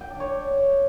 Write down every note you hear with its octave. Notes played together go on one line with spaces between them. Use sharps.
G5
D4
C#5